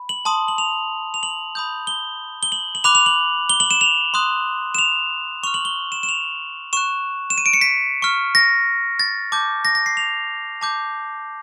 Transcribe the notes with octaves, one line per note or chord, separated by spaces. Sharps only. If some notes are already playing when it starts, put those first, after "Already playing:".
Already playing: B5
F#7
A5 C6 D#6
F#7
F7
F7
F#7
B5 D#6 G6
G7
G7
F#7
F#7
B5 D6 F#6 F7
F7
F#7
G7
F#7
E7
F7
C6 D#6 F#6
E7
F7
C#6 F6 F7
F#7
G7
E7
E7
F7
C#6 F#6 E7
E7
D#7
D7
C#7
B6
C#6 F6
A#6
A6
A5 D6 G6
A#6
A#6
C7
F7
A5 D6 G6